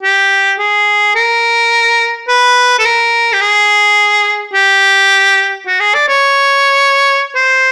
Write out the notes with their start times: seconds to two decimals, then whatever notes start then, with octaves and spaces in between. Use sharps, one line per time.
0.03 G4
0.59 G#4
1.15 A#4
2.29 B4
2.79 A4
2.85 A#4
3.33 G4
3.41 G#4
4.54 G4
5.67 F#4
5.80 G#4
5.94 D5
6.09 C#5
7.36 C5